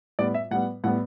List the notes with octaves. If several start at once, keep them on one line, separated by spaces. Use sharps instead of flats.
A2 G3 B3 D5
E5
A2 G3 B3 F#5
A2 G3 B3 F#5